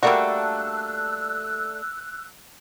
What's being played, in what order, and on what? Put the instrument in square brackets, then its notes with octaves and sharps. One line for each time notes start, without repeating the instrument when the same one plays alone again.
[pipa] G3 A#3 F#4 [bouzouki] A3 D4 A4 [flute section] E6 F#6